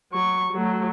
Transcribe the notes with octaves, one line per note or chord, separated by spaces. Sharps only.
F#3 C#6
F#3 A3